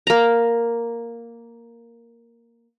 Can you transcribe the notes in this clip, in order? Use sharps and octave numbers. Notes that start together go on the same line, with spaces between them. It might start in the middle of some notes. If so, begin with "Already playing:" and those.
A#3 A#5